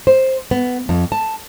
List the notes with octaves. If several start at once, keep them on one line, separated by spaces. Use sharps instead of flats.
C5
B3
F2
A5